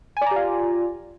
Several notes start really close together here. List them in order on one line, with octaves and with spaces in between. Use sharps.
G#5 D5 A#5 G4 F4